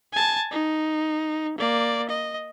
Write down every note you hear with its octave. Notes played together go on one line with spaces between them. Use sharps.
G#5 A5
D#4
A#3 D5
D#5